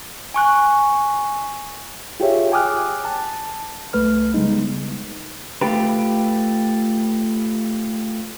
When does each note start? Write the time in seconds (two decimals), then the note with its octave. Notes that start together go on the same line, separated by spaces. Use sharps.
0.34 G#5 C#6 F#6
2.20 F4 G4 G#4 C#5 E5
2.52 G5 G#5 D6 D#6 F6 F#6
3.05 A5
3.93 C2 A3 B4 F6
4.34 C#3 G3 G#3 B3 D#4
5.61 A3 F4 G4 B4